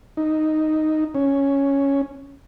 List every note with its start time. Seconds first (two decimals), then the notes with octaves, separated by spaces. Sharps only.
0.17 D#4
1.15 C#4